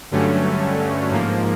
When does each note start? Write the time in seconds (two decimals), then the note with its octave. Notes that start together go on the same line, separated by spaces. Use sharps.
0.11 G2 D3 F#3 A3 C#4
1.11 G#2 F3 A#3